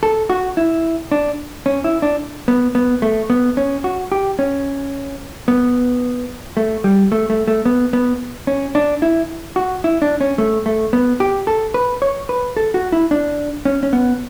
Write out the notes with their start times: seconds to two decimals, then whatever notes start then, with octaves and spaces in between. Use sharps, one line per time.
0.03 A4
0.30 F#4
0.57 E4
1.12 D4
1.66 C#4
1.84 E4
2.02 D4
2.48 B3
2.75 B3
3.02 A3
3.30 B3
3.57 C#4
3.84 F#4
4.12 G4
4.39 C#4
5.48 B3
6.57 A3
6.84 G3
7.12 A3
7.30 A3
7.48 A3
7.65 B3
7.93 B3
8.47 C#4
8.75 D4
9.02 E4
9.56 F#4
9.84 E4
10.02 D4
10.21 C#4
10.38 A3
10.66 A3
10.93 B3
11.20 G4
11.47 A4
11.74 B4
12.02 C#5
12.29 B4
12.57 A4
12.74 F#4
12.92 E4
13.11 D4
13.65 C#4
13.83 C#4
13.93 B3